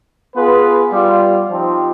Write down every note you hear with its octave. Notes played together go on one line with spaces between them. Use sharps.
B3 F4 G#4 B4
G3 B3 F4
F3 C4 D#4 G4